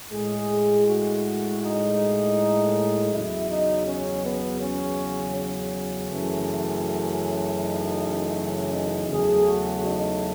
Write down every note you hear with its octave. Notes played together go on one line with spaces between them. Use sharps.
A2 G#3 G#4
F#4
D#4
E2 C#3 F#3 E4
D#4
C#4
B3
C#4
C#4
F#2 C#3 E3 A3
D#4
C#4
D#4
E2 C#3 F#3 A3 G#4
F#4
D#4